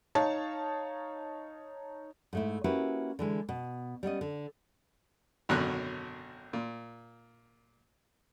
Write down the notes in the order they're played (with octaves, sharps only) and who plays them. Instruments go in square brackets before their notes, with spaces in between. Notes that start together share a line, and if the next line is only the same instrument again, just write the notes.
[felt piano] D#4 C#5 F5 A5
[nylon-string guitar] G#2 A3 E4
A#3 C#4 E4 F#4 G4 B4
D3 E3 G#3
B2
G3 B3 C#4 D#5
D3
[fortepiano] G#1 F#2 B2 D3 F#3 F#6
A#2